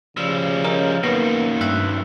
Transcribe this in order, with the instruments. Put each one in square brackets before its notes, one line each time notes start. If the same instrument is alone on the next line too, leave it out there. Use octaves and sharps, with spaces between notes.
[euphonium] C#3 [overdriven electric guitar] F3 G3 [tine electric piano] E6
[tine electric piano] C#4 A#4 D#5
[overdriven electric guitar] F#2 D#3 [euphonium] A#3 [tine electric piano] B3
[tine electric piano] G2 E5 F#6